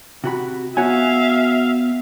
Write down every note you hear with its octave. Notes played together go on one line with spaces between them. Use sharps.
C3 F#4 B5
B3 F#4 C#5 E5 F5 G#5